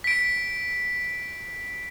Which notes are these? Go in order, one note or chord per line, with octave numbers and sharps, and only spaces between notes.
B6 D7